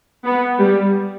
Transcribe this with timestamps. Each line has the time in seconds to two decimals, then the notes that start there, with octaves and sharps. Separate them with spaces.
0.26 B3
0.60 G3